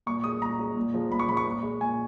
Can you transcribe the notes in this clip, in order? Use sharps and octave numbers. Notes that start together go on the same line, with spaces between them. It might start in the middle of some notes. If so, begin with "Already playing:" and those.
A#2 C#6
G#3 D#6
A#2 A#5
G#3
A#2
F3 G#3
A#2 B5
C#6
F3 G#3 B5
C#6
A#2
G#3
A#2 G#5